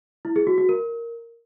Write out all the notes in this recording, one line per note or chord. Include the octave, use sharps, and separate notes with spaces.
E4
G#4
F#4
F#4
A#4